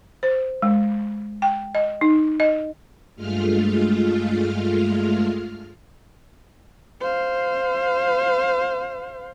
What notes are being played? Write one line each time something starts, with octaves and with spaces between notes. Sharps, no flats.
C5
G#3
G5
D#5
D#4
D#5
G2 G#3 A3 F4 F6
C5 F5